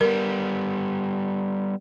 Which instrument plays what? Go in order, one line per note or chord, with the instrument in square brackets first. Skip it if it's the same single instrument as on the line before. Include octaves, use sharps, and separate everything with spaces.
[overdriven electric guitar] G3 B3 [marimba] A#4